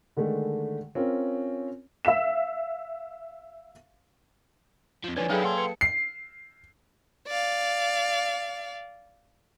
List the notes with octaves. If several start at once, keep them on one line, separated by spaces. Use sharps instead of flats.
D3 D#3 G#3 A3
C4 C#4 F4 A#4
E5 F5 B6 E7
F2 F3
D3 F3 B4 C#5 D5 G#5
F#3 D#4 E4 G#4 A4 B4 F5 G5
A#3 F#5 A5 C6
B4 C#7
C7
D5 F5